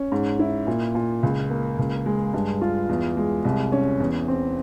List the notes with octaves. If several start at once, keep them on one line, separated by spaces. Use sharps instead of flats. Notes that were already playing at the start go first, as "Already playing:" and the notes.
Already playing: C#4
G#2
E4
A#2
A#2
C#2
A#3
C#2
G#3
G2
F4
E2
G#3
C2
C#4
E2
C4